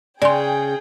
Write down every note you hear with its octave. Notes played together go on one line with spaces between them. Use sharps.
C#3 G#4 D5 G5 C6